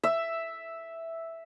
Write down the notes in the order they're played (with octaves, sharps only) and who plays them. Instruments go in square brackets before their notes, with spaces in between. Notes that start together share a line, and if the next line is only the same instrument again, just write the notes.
[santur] E5